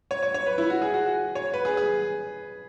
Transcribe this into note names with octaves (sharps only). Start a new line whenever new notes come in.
C#5
C#5
C#5
B4
E4
F#4
G#4
F#4
F#4
C#5
B4
G#4
G#4